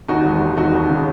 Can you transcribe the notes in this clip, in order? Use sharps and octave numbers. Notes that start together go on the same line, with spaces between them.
D#2 D#4 F#4
E1
D#2
E1 D#4 F#4
D#2
C#3